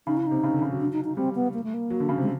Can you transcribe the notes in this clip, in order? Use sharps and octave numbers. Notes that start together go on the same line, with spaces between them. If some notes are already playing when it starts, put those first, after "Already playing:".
C#3 D#4
C#3 E4
C3 D#4
C#3
D3
C#3
F#3
D4
D#4
D#4
G3 C4
B3
A#3
A3
A#3
F#3
D3
C#3
C3 G#3